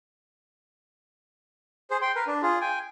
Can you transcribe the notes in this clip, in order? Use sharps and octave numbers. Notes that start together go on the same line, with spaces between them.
G#4 C5
G5 C6
A#4 B4
D4
F4 G#4
G5 G#5